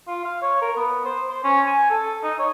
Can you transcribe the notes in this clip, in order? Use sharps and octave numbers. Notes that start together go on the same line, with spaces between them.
F4
F5
C#5
A#4
B3
C5
C5
C#4
G#5
A4
D#4
C#5